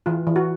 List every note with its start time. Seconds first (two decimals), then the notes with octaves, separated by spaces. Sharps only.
0.06 E3 F4
0.27 E3
0.36 F#4